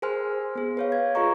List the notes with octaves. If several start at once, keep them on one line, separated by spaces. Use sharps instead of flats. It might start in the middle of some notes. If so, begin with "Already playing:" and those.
G#4 A#4 C5 G#5 C6 F6
B3 G#4
B4 C#5 F5
G#6
F4 G#4 B4 D#5 A#5 C#6